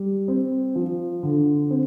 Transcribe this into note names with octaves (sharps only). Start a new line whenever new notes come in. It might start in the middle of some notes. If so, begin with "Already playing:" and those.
Already playing: G3
C4
F3
D3
C4